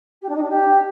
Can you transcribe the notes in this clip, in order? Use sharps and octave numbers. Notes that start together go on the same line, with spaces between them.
G4
D4
D#4
D4
G4